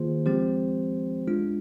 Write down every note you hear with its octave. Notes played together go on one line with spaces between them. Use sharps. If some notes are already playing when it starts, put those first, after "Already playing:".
Already playing: D#3 A#3 F4 G#4 C5
F3 G#3 C4 G4 C5
G#3 D4 F4